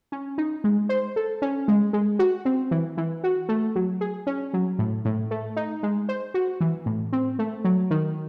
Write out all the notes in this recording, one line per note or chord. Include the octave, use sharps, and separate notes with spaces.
C#4
D#4
G#3
C5
A4
C#4
G#3
G#3
F#4
C4
E3
E3
F#4
A3
F#3
G#4
C#4
F#3
A2
A2
A3
D#4
G#3
C5
F#4
E3
A2
C4
A3
F#3
D#3